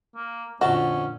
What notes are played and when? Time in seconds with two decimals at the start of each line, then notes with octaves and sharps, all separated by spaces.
0.16 A#3
0.61 F2 A#2 D3 C#4 F#4 A5